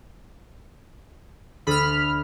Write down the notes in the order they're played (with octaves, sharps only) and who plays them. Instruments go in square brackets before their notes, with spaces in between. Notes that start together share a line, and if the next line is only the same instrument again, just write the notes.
[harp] D2 A4 D#6 [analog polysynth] B5 F6